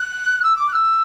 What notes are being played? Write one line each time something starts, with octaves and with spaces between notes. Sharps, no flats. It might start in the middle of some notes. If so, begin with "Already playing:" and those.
Already playing: F#6
E6
D6
F#6
E6